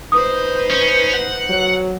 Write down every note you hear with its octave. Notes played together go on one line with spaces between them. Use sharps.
D#4 B4 C5 D#6
C#4
F#5
F#3